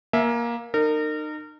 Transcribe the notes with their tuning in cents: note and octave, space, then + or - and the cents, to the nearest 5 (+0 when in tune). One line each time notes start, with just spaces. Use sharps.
A#3 +15 E5 +0 G#5 +40
D#4 -30 A#4 -30